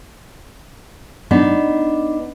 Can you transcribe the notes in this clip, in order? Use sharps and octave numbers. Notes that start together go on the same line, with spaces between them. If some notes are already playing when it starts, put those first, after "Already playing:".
B3 D4 D#4